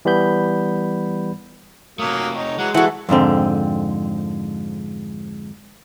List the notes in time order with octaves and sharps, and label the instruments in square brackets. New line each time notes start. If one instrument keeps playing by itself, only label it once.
[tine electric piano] E3 G3 B3 B5 G6
[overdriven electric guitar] C3 A3 [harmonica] F#3 A#3 D#6
[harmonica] D#4 C#5
[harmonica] E3 F#3 F#5 [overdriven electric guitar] G#3
[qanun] E3 G#4 [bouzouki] F#4 F#5 [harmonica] A4
[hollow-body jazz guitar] F2 G#2 D3 C4